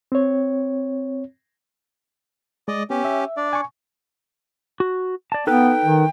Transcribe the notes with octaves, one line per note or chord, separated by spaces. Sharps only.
C4 C#5
G#3 D5 D#5
B3 C#4 G4
E5
D4 D5
G#5 C#6
F#4
D5 A5
B3 D#4 A4 B4 G5
D#3